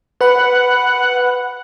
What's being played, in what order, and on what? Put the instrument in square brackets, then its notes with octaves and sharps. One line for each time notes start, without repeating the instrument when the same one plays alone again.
[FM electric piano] B4 B5 [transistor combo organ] F#5